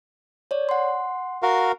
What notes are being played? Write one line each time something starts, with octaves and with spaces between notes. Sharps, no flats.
C#5 D5
F#5 C6
F#4 A#4 F5